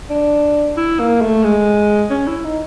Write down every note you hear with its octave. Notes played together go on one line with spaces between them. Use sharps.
D4
E4
A#3
A3
G#3
C#4
E4
D#4